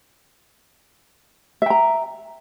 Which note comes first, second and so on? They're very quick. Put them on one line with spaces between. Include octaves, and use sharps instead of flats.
E5 G5 A#5